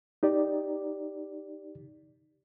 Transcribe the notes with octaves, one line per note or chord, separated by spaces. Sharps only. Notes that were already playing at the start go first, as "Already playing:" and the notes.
D#4 G4 D5